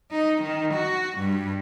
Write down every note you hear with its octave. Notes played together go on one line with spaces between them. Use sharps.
D#4
D#3
F#4
G2